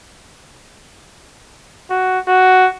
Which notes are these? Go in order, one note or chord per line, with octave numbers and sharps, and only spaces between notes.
F#4
F#4